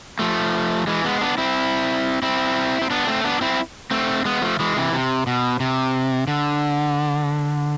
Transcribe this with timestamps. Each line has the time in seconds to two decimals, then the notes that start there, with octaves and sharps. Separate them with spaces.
0.19 F3 A3
0.87 E3 G#3
1.04 G#3 B3
1.21 B3 D4
1.38 C4 E4
2.22 C4 E4
2.82 C4
2.90 B3 D4
3.07 A3 C4
3.24 B3 D4
3.41 C4 E4
3.91 A3 C4
4.25 G#3 B3
4.42 F3 A3
4.60 E3 G#3
4.76 C3 E3
4.93 C3
5.27 B2
5.60 C3
6.27 D3